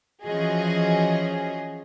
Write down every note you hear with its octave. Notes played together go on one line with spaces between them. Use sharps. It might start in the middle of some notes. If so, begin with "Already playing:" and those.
E3 F3 C#4 F#4 G#4 D#5